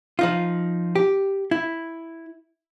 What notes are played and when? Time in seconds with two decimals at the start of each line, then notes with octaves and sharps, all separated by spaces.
0.19 F3 D#4 F4
0.95 G4
1.51 E4